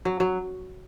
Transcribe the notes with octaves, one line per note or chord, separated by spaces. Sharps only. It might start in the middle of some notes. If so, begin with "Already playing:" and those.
F#3
F#3